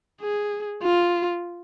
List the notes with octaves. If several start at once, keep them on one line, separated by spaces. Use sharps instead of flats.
G#4
F4